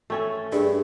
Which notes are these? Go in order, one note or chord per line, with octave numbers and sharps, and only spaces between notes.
A3 C#4 A4
G2 G#4